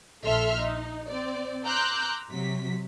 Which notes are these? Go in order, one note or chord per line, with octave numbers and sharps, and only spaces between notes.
A#1 A4 E5 C6 F6
D#4
C4 D5
A#5 C6 D6 E6 F#6 G6
C3 F#3 B6